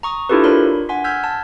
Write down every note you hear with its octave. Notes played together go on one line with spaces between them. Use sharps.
A#5 C#6 D#6
D4 E4 F4 G4 A4 B4
D4 A#4 C#5 B5 C6
F#5 G#5 C6 B6
E6 F6 G6 G#6 B6
A5